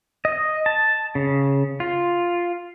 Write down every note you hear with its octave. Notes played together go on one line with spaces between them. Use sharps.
D#5
A5
C#3
F4